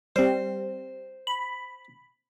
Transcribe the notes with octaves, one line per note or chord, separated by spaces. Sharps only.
G3 C4 C5
B5